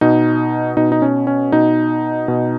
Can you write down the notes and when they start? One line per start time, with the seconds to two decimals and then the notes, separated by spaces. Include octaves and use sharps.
0.01 B2 D#4
0.77 B2 D#4
0.92 D#4
1.02 C#4
1.27 C#4
1.52 B2 D#4
2.28 B2